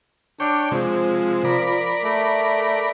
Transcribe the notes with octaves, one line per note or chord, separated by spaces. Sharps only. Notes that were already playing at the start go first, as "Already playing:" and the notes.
D4 C#5 G5 D6
C3 F3 G#3
A#4 D5 B5
A3